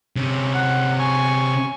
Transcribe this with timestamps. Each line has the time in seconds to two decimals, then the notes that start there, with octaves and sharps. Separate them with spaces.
0.16 C3 C#4
0.54 F#5
0.99 G#5 C#6